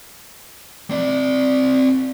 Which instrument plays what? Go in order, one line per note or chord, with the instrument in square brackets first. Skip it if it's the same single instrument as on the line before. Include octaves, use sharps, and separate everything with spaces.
[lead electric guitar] C4 D5